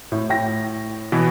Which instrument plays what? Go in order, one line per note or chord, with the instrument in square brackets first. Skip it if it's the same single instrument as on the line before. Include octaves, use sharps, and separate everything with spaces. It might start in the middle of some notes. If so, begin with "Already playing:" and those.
[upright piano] A2
A2 G5 A#6
[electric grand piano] B2 E3 B3